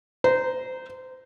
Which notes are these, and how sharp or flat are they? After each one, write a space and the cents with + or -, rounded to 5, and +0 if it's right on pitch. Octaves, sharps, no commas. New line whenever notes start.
C5 -25 A#5 +0